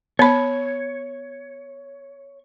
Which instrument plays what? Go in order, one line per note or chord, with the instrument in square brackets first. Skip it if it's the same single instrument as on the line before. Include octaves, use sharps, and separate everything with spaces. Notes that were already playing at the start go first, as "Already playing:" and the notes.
[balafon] B3 B5 [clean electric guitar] C#5